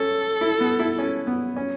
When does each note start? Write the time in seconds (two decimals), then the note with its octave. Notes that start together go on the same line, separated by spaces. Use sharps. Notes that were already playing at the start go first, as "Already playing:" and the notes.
Already playing: C#4 A4
0.41 E4
0.60 B3
0.79 E4
0.98 C#4
1.27 B3
1.56 C#4